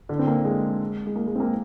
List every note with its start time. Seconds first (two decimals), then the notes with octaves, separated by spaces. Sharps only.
0.09 D3
0.19 C4
0.27 A#3
0.45 G#3
1.07 G#3
1.16 A#3
1.27 G#3
1.35 C4
1.40 A#3